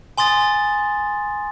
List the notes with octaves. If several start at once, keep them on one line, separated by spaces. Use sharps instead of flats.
G#5 C6 D#6 A6